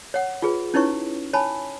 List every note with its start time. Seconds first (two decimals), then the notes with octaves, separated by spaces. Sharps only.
0.14 C#5 F#5
0.42 F4 G#4 B4
0.74 C#4 D#4 E4 B4 C#5 C#6
1.34 C#5 G#5 A5 B5